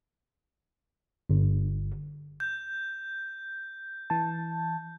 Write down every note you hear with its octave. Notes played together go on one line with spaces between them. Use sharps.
G1
G6
E3 A5